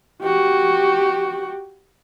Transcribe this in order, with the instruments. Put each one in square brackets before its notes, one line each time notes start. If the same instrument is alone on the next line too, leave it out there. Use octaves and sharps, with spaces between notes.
[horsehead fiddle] F#4 G4